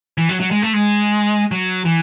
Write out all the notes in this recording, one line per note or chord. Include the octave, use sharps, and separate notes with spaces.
E3
F#3
F#3
G#3
A3
G#3
F#3
E3